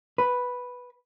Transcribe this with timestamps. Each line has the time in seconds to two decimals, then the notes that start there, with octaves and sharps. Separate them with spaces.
0.18 B4